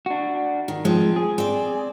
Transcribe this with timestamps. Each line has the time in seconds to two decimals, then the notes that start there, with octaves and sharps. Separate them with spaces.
0.06 D4 F#4
0.68 D#3
0.85 F3 G#3 C4
1.16 G#4
1.38 C4 D5